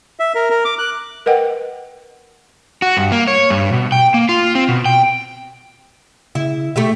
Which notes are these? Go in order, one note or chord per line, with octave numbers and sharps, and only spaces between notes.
E5
A#4
A#4
D6
F#6
A#4 B4 D#5 F#5 G5
F#4
G2
A#3
C#5
G2
B2
G5
A#3
F4
C4
B2
G5
C#3 E4
B2 A3 G4 E5